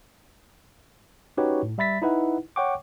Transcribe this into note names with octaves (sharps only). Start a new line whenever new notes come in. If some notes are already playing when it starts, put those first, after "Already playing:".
C#4 D#4 F#4 G4 B4 C#5
A2
G3 E5 B5 A6 B6
D#4 E4 B4 F#5
C#5 F#5 G5 C#6 D6